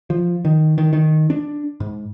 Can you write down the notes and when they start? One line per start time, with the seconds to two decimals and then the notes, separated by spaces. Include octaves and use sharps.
0.10 F3
0.45 D#3
0.78 D#3
0.93 D#3
1.30 D4
1.80 G#2